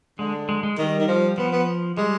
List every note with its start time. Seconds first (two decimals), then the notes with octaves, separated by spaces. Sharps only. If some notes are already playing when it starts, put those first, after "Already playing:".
0.19 D3 G#3
0.49 G#3
0.63 G#3
0.78 D#3 G3
1.00 D#3
1.08 F3
1.38 F3 B3
1.52 B3
1.97 G3 G#3